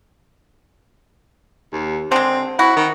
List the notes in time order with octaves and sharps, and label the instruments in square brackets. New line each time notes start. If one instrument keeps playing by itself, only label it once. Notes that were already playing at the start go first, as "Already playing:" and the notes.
[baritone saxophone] D#2
[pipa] D3 G#3 [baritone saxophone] C4
[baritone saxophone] E4 [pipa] F#4
[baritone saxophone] D#3